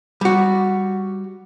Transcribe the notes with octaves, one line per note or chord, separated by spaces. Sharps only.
G3 F#4